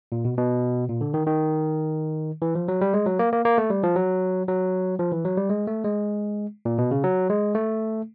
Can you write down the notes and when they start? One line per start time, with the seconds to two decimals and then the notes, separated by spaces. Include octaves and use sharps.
0.12 A#2
0.25 B2
0.38 B2
0.89 A#2
1.01 D3
1.14 D#3
1.27 D#3
2.42 E3
2.55 F3
2.68 F#3
2.81 G3
2.94 G#3
3.06 F#3
3.19 A#3
3.33 A#3
3.45 A#3
3.58 A3
3.70 G3
3.83 F3
3.96 F#3
4.48 F#3
4.99 F3
5.12 E3
5.25 F#3
5.37 G3
5.50 G#3
5.67 A3
5.84 G#3
6.65 A#2
6.78 B2
6.91 C#3
7.04 F#3
7.29 G#3
7.55 A3